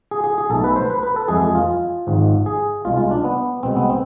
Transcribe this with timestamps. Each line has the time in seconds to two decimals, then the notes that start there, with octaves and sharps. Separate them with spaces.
0.11 G#4
0.24 G#4
0.38 G#4
0.50 B1 B2 A3 A4
0.64 B4
0.76 C5
0.90 B4
1.03 B4
1.16 A4
1.28 F2 E3 G#3 G#4
1.41 G#4
1.55 F4
2.07 G#1 G#2 F3
2.46 G#4
2.85 C2 B2 G#3 F4
2.97 F4
3.11 D4
3.24 B3
3.63 C2 B2 G#3 C4
3.76 B3
3.89 C4